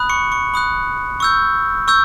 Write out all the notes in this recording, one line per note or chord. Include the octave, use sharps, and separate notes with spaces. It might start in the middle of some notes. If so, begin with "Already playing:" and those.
Already playing: B5 D#6 F#6
C#6 C#7
C#6 C#7
B5 D#6 F#6
C#6 E6 G6
C#6 E6 G6